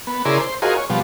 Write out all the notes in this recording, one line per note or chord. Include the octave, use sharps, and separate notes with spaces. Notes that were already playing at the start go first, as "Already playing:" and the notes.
B3
C#3 E4 G#4 A#4 D5 C6
C5
F4 F#4 G#4 A#4 C5 D#5
C#5
B2 F3 G3